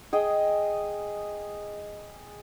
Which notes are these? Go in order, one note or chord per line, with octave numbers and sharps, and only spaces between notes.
G#4 D#5 G5